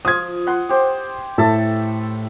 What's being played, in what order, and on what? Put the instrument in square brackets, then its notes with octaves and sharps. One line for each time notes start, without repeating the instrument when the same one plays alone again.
[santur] F3 F4 [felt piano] D#6 G#6
[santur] F#5 C6
G4 C5
[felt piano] A2 [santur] A4 E5 A5